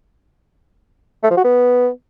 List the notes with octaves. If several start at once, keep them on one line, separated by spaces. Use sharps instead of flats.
A3
F3
F#4
B3